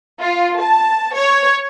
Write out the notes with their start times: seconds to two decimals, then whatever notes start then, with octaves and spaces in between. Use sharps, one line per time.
0.21 F4
0.61 A5
1.16 C#5